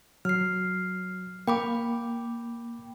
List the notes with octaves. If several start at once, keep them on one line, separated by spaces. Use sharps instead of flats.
F#3 F6 C7
A#3 G5 B5 D6